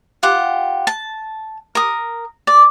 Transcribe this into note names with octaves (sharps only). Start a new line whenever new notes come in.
F4 G4 F#5
A5
A#4 D#6
D5